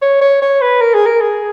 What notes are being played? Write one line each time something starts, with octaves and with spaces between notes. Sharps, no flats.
C#5
C#5
C#5
B4
A#4
G#4
A#4
G#4